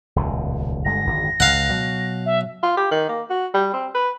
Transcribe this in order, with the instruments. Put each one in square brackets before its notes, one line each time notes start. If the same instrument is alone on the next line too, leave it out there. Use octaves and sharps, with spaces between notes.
[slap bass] D#1 C#2 B2
[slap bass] G1 D3 G#3 [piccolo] A#6
[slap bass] G#1 F2 D3
[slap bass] C#2 [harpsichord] F5 F#5
[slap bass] B2 F#3
[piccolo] E5
[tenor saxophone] F4
G4
D#3
A#3
F#4
G3
C4
B4